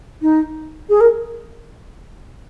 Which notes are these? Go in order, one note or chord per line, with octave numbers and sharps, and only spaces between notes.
D#4
G#4
A#4